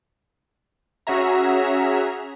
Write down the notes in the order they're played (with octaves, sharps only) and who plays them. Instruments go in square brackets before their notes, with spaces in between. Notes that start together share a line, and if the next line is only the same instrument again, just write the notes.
[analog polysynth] C#4 F#4 G#4 E5 A#5